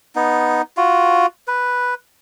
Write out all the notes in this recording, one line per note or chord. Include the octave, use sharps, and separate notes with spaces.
B3 D#4
F4 F#4
B4